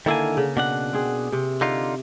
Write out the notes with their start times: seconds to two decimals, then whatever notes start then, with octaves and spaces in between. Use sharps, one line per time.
0.06 D3 D#3 A#3 E4 F5 G#5
0.37 C#3
0.57 B2 D4 F#5
0.93 C4 G#4
1.32 C3
1.61 D3 D#4 F4